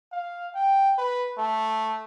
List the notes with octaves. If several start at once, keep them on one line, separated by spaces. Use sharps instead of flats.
F5
G5
B4
A3